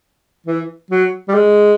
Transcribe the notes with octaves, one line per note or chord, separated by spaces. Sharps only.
E3
F#3
G3
G#3